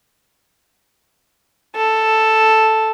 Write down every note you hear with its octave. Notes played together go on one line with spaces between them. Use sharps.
A4